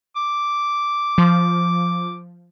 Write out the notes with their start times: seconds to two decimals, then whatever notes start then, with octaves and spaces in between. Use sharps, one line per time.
0.16 D6
1.18 F3